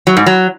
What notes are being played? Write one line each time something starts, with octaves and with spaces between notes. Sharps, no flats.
F#3
G#2
F#3